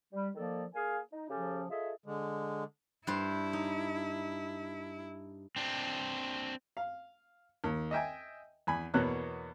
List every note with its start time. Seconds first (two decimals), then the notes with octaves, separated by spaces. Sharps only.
0.13 G3
0.35 D#3 F3 A#3 A4 D5
0.75 A#3 G#4 F5 G#5
1.12 D#4
1.30 C#3 F3 C#4 G4 A4
1.69 F4 G#4 A4 D#5 E5
2.06 D3 G#3
3.07 G2 E4 C5
3.53 D#4
5.56 C4 D4
6.77 F5
7.64 D#2
7.91 D#5 E5 G5 G#5
8.67 E2 G#5 B5
8.94 E2 B2 A#3 B3 C#5 F#6